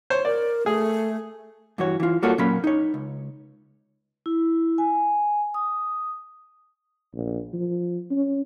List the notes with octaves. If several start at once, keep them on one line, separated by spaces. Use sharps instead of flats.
C5 C#5
A#4 D5
A3 G#4
G2 E3 F#4 C#5
E3 F4
G3 A#3 F4 F#4 A4 C#5
A#2 F#3 A#3 C#4 B5
D#4 C#5
C#2
E4
G#5
D#6
A#1
F3
C#4